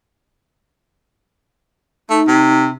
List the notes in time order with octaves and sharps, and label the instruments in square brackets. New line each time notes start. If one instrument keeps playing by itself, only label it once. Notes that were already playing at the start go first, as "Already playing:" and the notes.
[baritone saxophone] A3 [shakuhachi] D#4
[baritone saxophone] C3